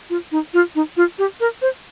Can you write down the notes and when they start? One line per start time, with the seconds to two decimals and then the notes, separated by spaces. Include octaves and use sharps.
0.10 F4
0.32 D#4
0.54 F4
0.75 D#4
0.97 F4
1.19 G4
1.40 A#4
1.62 C5